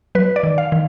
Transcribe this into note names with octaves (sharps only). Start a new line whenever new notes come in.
F#3 B4
D5
D#3
F5
D#3